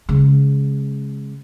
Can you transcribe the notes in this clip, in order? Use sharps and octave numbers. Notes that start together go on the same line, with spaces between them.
C#3 G#3